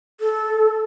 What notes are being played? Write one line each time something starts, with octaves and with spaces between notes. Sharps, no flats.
A4